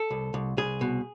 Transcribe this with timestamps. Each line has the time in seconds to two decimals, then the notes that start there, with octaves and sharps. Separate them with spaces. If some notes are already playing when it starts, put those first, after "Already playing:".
Already playing: A4
0.11 C2
0.34 C2
0.57 C2 G#4
0.81 B2